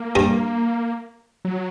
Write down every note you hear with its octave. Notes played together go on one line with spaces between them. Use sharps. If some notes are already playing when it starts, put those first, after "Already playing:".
Already playing: A#3
G2 G3
F#3